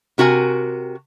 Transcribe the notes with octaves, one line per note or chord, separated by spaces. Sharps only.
C3 F#4 A#4 G#5